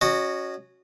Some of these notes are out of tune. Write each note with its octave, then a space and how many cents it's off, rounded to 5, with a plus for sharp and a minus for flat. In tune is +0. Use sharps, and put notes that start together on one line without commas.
C#4 +0 F#4 +0 D#5 -30